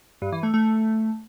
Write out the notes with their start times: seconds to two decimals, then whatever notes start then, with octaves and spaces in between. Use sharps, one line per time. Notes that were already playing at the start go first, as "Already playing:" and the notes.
0.22 G2
0.32 E3
0.43 A3
0.54 A3